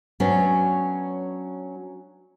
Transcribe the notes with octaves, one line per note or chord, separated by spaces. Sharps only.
F#3 B3 C#4 D4